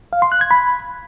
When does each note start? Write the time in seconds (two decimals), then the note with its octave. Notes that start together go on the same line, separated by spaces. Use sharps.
0.13 F5
0.22 C6
0.32 F#6
0.41 G#6
0.51 B5